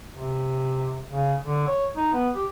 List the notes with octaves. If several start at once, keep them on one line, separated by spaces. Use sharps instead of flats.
C3
C#3
D3
C#5
D#4
B3
G4